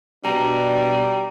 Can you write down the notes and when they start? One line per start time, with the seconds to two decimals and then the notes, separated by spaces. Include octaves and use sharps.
0.25 B2 G3 D4 A#5